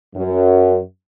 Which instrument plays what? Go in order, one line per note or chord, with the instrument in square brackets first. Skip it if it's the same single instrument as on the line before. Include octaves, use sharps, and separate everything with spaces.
[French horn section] F#2